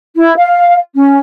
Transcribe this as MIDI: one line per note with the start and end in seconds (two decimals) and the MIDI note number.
0.16 0.32 64
0.36 0.77 77
0.95 1.18 61